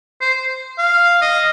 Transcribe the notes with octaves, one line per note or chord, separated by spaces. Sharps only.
C5
F5
D#5